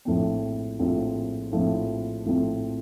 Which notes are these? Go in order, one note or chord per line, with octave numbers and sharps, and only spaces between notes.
A#1 A2 F3 C4
A#1 A2 F3 C4
A#1 A2 F3 C4
A#1 A2 F3 C4